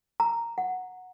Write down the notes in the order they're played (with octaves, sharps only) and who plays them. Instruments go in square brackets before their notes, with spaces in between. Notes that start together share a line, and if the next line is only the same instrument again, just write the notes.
[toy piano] A#5
F#5